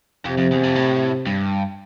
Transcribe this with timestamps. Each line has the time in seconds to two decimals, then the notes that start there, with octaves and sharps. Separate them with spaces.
0.25 F2 C3
0.38 F2
0.52 E2
0.64 F2
0.76 A2
1.27 G2